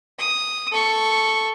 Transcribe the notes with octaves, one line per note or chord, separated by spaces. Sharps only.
D#6
A4 C#6